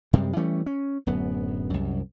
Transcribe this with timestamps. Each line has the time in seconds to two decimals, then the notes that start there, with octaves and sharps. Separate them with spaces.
0.13 F#2 C3 G3 G#3
0.36 E3 G3 A3 C#4
0.66 C#4
1.07 D1 F#2 B3
1.70 C2 F#2